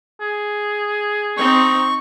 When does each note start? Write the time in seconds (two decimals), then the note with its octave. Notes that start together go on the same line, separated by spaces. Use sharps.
0.20 G#4
1.37 C4 D#4 C#6